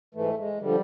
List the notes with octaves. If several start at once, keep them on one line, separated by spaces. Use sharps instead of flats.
G#2 E3 A3
G#3
D3 F3 G3